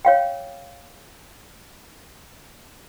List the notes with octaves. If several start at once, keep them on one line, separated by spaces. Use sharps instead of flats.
C#5 F5 G5